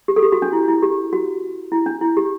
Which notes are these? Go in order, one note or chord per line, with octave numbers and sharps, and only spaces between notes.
G4
A4
G4
F#4
D4
E4
E4
G4
F#4
E4
D4
E4
G4